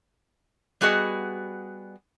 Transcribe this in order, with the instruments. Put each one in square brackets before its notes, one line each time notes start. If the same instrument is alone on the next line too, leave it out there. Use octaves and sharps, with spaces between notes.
[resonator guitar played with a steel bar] G3 B3 F#4 G#4 D#5